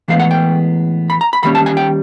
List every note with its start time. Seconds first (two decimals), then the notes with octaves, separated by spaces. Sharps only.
0.08 A2 E3 G#3 B3 F5
0.20 F#5
0.31 G5
1.10 B5
1.21 A#5
1.33 B5
1.43 D#3 G3 A#3 C#4 B5
1.55 A5
1.66 G#5
1.77 G5